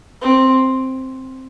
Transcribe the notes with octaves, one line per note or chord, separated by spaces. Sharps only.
C4